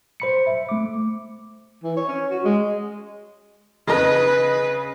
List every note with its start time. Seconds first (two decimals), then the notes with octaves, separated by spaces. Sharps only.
0.20 C5 B5 C#7
0.47 E5
0.69 A3 D6
1.83 E3
1.96 C#5
2.08 C#4
2.30 F#4
2.45 G#3
3.87 C#3 B4 D#5